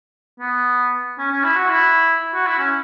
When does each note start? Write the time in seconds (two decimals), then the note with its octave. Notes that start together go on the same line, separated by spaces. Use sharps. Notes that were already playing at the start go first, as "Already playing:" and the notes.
0.40 B3
1.18 C#4
1.31 C#4
1.44 E4
1.56 F#4
1.69 E4
2.34 F#4
2.46 E4
2.59 C#4